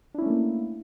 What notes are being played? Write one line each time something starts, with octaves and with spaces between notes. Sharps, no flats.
A3 A#3 C#4 D4 E4